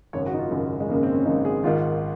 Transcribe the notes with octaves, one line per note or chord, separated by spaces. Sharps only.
G#1 F#2 C#3 C#5
F#4
D#4
F4
G#1 F#2 C#3
G#3
G#1 F#2 C#3 A#3
C4
C#4
G#1 F#2 C#3 D#4
G#4
G#1 G#2 D#3 F4